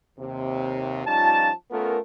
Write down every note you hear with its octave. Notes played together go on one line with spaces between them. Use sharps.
D#2 C3
F3 G3 C#4 D#4 F4 A5
A3 B3 C#4 F4 A4 A#4